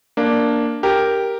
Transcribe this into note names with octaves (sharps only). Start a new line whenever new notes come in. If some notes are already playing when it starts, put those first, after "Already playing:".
A#3 D4
G4 A#4